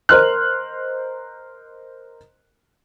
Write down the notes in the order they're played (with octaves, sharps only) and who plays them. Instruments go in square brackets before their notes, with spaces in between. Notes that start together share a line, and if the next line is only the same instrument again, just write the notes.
[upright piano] A#4 C5 D#5 C6 F6 F#6